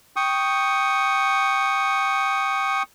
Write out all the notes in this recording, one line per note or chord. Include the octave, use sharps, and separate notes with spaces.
G5 C#6 D#6